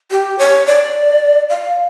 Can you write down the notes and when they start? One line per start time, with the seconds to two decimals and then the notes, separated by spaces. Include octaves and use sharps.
0.11 G4
0.39 C#5
0.67 D5
1.50 F5